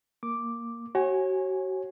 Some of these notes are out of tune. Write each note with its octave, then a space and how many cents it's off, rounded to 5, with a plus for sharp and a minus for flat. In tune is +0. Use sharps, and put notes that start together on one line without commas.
A#3 +0 D6 +0
F#4 +35 C#5 -30 G#5 +0